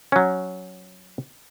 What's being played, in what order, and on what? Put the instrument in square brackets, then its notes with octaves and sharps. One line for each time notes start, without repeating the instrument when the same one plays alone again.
[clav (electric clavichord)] F#3 C#4